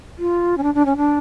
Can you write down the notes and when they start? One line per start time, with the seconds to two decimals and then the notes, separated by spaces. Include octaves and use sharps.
0.18 F4
0.57 C#4
0.63 D4
0.74 D4
0.85 C#4
0.96 D4